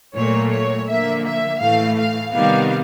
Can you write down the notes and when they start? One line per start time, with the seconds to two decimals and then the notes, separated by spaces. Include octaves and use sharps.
0.15 A#2 F#3 A3 C#5
0.51 C#5
0.87 D3 F3 A#3 E5
1.24 E5
1.60 A2 E3 A3 F5
1.97 F5
2.33 C3 D#3 G3 B3 F5